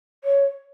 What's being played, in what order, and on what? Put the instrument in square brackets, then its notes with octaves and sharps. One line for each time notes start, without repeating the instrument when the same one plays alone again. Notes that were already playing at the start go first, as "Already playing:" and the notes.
[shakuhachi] C#5